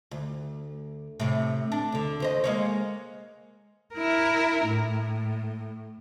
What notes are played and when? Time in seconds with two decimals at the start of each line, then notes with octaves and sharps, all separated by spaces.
0.11 D2
1.20 A2 C3
1.72 D4
1.92 D2 D3
2.20 D#2 C5 D#5
2.44 G#3 A#3 C#5
3.95 E4 A#4
4.66 A2